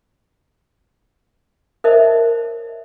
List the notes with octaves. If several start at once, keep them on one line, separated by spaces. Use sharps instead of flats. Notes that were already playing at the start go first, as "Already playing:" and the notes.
A#4 C5 C#5 D#5 E5 A5